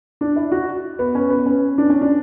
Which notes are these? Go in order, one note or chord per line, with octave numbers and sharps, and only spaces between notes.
D4
E4
F#4
B3
C#4
B3
C#4
D4
C#4
D4